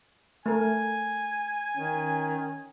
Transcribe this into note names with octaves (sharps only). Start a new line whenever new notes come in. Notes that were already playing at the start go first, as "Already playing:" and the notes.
A3 A#4 G#5
D#3 C#4